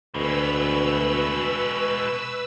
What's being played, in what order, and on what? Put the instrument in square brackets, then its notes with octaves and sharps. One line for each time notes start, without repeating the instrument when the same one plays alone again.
[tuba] D2 [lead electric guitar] B2 G#3 [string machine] B4 E6